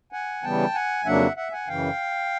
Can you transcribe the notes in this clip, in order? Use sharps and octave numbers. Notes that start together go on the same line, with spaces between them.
F#5 G#5
C#3 E3 G3 B3 G5 A5
F#5 G#5
F2 C#3 F#3 A#3 D4 E5 F#5
E5 F#5
F#5 G#5
F#2 C#3 E3 F5 G5